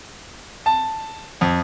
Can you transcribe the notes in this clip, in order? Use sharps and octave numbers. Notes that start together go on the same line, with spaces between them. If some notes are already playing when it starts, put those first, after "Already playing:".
A5
F2